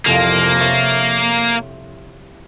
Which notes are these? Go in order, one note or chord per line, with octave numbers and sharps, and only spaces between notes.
C2 F2 A#3 F5
C#5 E5 A6